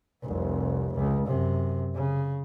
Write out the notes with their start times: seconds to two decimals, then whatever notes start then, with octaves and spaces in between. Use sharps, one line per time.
0.24 F1 C2
0.94 C#2
1.26 F#2 C3
1.94 C#3